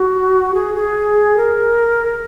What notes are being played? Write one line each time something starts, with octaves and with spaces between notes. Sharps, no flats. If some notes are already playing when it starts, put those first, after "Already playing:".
Already playing: F#4
G#4
G#4
A#4